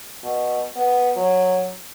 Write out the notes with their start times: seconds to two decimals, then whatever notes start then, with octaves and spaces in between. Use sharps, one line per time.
0.23 B2
0.76 B3
1.16 F#3